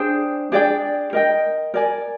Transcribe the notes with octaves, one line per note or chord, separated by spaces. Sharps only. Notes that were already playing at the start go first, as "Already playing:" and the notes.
Already playing: D4 G#4 C5 G5
D4 G#4 D5 G5
A#4 D#5 G5
A#4 D5 G#5